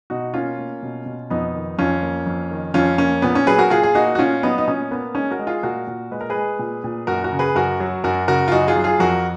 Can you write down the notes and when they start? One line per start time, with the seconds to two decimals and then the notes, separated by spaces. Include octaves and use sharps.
0.10 B2 D#4 F#4
0.34 A#3 C#4 F4
0.58 A#3
0.83 B2
1.06 B2
1.30 F2 B3 D#4
1.55 D#3
1.79 F2 C#4 F4
2.03 A#3
2.26 F2
2.51 D#3
2.74 F2 C#4 F4
2.98 A#3 C#4
3.22 A#2 B3
3.35 C#4
3.47 F#3 G#4 B4
3.59 F#4 A#4
3.70 A#2 F4 G#4
3.83 G#4
3.95 A#3 D#4 F#4
4.15 F#4
4.19 A#2 C#4 F4
4.43 F#3 B3 D#4
4.58 D#4
4.67 A#2 C#4
4.91 A#3 B3
5.15 G#3 C#4
5.31 F#4 A#4
5.39 G#3
5.47 F4 G#4
5.63 A#2 F#4 A#4
5.87 A#2
6.11 G#3 B4
6.21 A#4
6.30 G#4 B4
6.35 G#3
6.59 A#2
6.84 A#2
7.07 F#2 F#4 A#4
7.24 F#4 A#4
7.32 C#3
7.39 G#4 B4
7.55 F#2 F#4 A#4
7.80 F#3
8.04 F#2 F#4 A#4
8.28 C#3 F#4 A#4
8.48 F4
8.52 F#2 D#4 F#4
8.67 F4 G#4
8.76 F#3
8.84 F4 G#4
8.99 F2 F#4 A#4